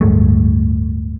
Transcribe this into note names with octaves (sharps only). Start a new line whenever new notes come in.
D1 G2 G#3 A3